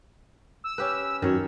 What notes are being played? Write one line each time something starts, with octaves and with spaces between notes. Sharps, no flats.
E6
C#4 G4 B4
F#2 D#3 C#5